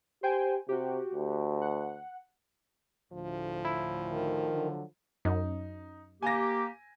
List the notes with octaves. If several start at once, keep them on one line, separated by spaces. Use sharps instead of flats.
G4 C5 G5 G#5
C3 F#4 G4
D2
F#5
D2 A2 F3
E4
D#3
D3 F#3
F#2 D#4
A#3 G4 G#5 A#6